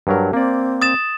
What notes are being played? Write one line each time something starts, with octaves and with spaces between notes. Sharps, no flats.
G2 F#3 A#4
A#3 C4 D5
D#6 A6 E7